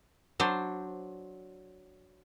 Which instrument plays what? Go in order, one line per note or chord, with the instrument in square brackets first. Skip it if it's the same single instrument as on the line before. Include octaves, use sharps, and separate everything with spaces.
[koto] F#3 D4 C5